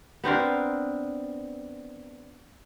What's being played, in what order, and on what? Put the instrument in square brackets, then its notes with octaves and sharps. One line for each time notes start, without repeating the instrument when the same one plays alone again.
[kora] B3 C4 D4 A#4